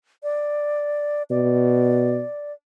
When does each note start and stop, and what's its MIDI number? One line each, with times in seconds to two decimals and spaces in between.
0.23 1.23 74
1.30 2.21 47
1.30 2.53 74